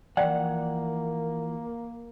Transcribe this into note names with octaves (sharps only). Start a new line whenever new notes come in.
E3 F3 A#3 D5 F#5 G5